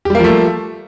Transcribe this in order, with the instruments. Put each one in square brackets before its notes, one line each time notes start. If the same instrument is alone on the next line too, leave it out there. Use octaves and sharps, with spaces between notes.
[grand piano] G4
G3
A#3
F3
A3